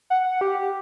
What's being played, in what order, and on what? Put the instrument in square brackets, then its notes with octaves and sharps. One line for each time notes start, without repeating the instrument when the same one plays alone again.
[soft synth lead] F#5
G4